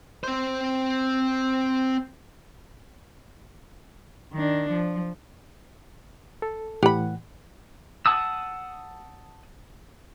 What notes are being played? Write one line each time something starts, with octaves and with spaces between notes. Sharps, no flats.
C4 C5
D#3 D4
F3
A4
A2 E3 G4 F#5 B5
F#5 A5 D#6 E6